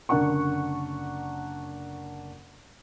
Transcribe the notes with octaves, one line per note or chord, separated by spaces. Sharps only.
F#1 D3 D4 A#4 F#5 C#6